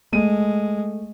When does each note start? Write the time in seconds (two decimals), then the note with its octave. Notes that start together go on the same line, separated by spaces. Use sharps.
0.13 G#3 A3 D#7